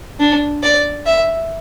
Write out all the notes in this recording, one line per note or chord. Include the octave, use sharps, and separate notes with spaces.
D4
D5
E5